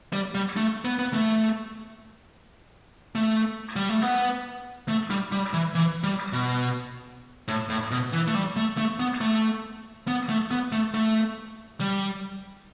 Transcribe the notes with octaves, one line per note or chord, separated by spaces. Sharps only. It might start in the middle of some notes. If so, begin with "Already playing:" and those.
G3
G3
A3
B3
B3
A3
A3
G3
A3
B3
A3
G3
G3
E3
E3
G3
B2
A2
A2
B2
E3
A3
G3
A3
A3
B3
A3
B3
A3
B3
A3
A3
G3